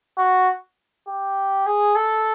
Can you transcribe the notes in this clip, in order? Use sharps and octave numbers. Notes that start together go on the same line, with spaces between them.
F#4
G4
G#4
A4